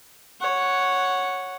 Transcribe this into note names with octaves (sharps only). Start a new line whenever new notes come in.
C#5 F#5